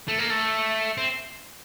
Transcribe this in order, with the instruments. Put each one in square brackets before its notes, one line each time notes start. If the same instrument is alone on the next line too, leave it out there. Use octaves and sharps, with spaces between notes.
[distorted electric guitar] A3
A#3
A3
C4